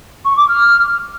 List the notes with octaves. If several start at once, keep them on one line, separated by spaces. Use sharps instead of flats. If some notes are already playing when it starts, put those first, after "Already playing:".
C#6
D6
F6